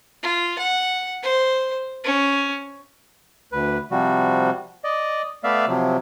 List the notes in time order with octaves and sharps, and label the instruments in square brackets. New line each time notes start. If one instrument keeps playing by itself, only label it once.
[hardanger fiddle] F4
F#5
C5
C#4
[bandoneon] D2 B4
C3 F3 G3 F#4
D5 D#5
A3 B3 D5 E5 F5
C3 F3 F#3